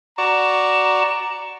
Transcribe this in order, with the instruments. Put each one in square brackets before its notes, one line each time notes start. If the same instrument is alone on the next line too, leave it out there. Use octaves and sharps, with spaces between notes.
[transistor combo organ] F#4 D5 C#6 [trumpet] A#5 [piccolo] E7